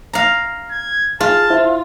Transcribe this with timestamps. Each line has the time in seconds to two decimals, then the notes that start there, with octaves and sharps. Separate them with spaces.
0.13 F5 A#5
0.71 G#6
1.20 F4 G#4 A5
1.50 E4 C5 E5